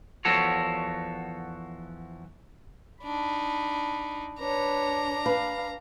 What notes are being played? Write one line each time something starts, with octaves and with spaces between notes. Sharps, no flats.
E2 F3 F#4 A4 C#5
D4 D#4 B5
D4 B4 C#5 A#5
B4 F5